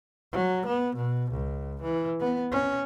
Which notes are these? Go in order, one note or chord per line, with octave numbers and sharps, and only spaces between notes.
F#3
B3
B2
C#2
E3
B3
C#4